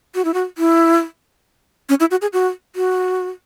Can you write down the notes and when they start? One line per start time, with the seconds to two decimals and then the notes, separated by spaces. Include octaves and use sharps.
0.15 F#4
0.25 E4
0.34 F#4
0.58 E4
1.89 C#4
2.00 E4
2.11 F#4
2.22 G#4
2.33 F#4
2.76 F#4